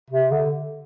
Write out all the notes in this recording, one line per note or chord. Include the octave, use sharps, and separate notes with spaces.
C3
D3